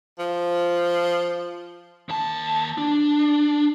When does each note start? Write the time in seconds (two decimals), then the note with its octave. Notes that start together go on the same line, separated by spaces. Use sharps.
0.19 F3
2.09 D#2 A5
2.78 D4